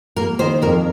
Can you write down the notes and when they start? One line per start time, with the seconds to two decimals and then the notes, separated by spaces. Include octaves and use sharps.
0.16 A#3 A#4
0.39 D#3 C5
0.62 F2 A#4